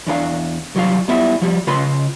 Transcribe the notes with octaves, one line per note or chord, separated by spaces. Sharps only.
E2 D4 A#4 F5
C2 F#3 G3 F4 F5
G3 B3 E4 F4 E5
F3 G3
C#3 F4 B4 B5 C6